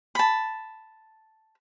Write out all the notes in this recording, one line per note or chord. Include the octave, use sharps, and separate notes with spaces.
A5 B5